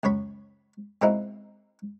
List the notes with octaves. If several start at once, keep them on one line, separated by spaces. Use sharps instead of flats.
C#2 F#2 C#5 B5
G#2 B2 A#3 C4 D#4 E4